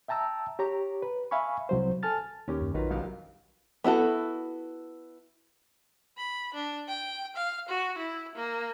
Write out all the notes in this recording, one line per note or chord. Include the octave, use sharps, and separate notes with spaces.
E5 G5 A5 A#5 E6
G4 C#5 A#5
B4
E5 F5 G#5 B5 C#6
C2 F#3 C5
A4 G#5 A5 F6 A6
D#2 C#4 G4 A#4
F#2
A#1 D#3 F#3 F4 A#4 B4
C2 F#2 F5
B3 E4 F#4 A4
B5
D4
G5
F5
F#4
E4
A#3